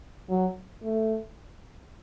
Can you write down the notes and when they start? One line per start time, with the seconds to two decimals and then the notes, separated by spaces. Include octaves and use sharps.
0.29 F#3
0.82 A3